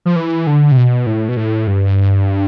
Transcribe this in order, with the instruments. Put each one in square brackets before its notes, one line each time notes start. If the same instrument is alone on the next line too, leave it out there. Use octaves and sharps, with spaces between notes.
[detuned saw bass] F3
E3
D3
C3
B2
A2
B2
A2
G2